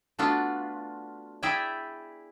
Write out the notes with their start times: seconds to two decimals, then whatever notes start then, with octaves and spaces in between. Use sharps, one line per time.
0.19 A3 B3 D4 F4 F#4
1.43 E4 G#4 D5 E5 G5 G#5